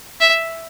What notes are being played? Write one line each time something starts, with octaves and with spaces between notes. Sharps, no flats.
E5